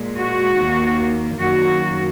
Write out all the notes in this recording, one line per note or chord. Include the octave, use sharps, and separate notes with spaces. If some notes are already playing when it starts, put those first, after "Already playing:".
Already playing: A#2 G#3
F#4
D#2 D#3 A#3
F#2 D#3 A#3 F#4